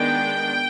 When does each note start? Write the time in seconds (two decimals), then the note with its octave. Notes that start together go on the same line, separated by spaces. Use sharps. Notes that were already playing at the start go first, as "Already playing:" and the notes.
Already playing: D#3 G#3 B3 D4 G5